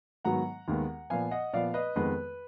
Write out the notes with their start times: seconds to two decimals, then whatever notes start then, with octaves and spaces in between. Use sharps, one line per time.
0.25 G#2 D#3 F#3 B3 F#5 A#5
0.68 D#2 D#3 G#3 B3
1.10 A#2 F3 B3 F5 G#5
1.31 D#5 F#5
1.53 A#2 F3 B3 D5 F5
1.74 B4 D#5
1.96 F2 D#3 G#3 B3 B4